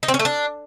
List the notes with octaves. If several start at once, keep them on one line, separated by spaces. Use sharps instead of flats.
D#4
C4
C#4
A3
D4